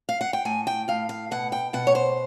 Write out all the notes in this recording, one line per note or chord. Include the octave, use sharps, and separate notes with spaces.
F5
F#5
G5
A2 G#5
G5
A2 F5
F5
B2 F#5
G5
B2 F#5
C#5
C5